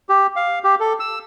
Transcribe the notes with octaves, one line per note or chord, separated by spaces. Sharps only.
G4
F5
G4
A4
E6